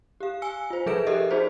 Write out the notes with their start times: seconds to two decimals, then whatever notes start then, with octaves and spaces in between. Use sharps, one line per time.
0.21 G4 F5
0.42 G#5 E6 C#7
0.70 F4 C5
0.86 F3 G#4 A4 B4 D7 E7
1.07 G4 A4 A#4 D#5 E5
1.30 D#4 F#4 G#4 C5 D5